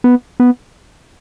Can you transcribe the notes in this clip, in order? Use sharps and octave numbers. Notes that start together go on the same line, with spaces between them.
B3
B3